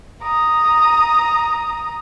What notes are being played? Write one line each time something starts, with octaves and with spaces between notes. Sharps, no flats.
A#5 D#6